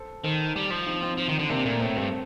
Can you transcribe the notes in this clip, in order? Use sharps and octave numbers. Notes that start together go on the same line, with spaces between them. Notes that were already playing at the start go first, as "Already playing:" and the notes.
Already playing: A4 C5
D#3 A4 C5
G3
F3
C4 D#4
C4 D#4
F3
D#3
D3
C3 A#3 D4
A#2 A3
A2 A3 C4
G2 A3 C4